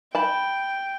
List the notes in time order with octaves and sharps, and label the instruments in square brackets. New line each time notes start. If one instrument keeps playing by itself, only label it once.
[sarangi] G5 [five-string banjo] A5 B5